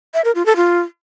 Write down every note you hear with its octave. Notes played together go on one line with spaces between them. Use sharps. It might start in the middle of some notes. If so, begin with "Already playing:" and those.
E5
A#4
F4
A4
F4